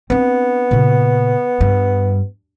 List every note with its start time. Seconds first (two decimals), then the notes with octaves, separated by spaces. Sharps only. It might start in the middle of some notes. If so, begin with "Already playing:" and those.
0.10 B3 C4 D4
0.71 A#2 C#3
1.61 G2